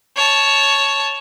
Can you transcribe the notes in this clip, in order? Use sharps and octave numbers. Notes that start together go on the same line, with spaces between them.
C#5 A5